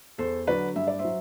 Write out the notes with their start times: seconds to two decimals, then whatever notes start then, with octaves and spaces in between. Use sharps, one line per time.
0.18 E2 A4 C5
0.47 D3 F#3 B4 D5
0.76 G2 E5
0.87 D5
0.99 C5 E5
1.04 F#3